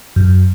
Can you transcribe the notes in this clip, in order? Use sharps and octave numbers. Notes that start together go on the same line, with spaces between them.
F#2